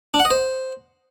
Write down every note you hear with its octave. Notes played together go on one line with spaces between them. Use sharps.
D4
F#5
D#5
C5